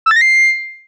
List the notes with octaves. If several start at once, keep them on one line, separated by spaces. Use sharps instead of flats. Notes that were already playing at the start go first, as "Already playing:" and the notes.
E6
A6
A#6
C7